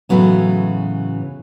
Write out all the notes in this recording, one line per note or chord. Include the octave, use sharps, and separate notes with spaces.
A2 C#3 E3 F#3 B3